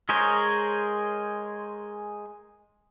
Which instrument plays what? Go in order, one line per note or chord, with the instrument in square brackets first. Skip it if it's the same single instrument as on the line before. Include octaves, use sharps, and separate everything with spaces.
[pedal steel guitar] G#3 G#4 A#4 C5 C#5